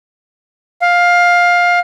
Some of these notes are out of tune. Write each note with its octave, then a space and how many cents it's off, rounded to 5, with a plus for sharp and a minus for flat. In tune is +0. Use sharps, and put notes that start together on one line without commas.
F5 +15